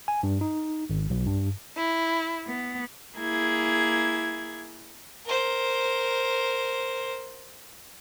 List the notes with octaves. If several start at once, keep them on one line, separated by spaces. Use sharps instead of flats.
G#5
G2
D#4
G#1
B1
G2
E4
B3
A#3 E4 G#4 G#6
A#4 C5